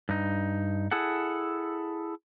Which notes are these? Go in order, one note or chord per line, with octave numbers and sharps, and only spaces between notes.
G2 D#4
E4 G#4 A4 F#5